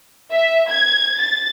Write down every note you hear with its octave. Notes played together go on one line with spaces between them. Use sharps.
E5
G#6
A6